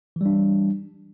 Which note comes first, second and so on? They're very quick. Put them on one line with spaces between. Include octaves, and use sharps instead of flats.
E3 G3 D4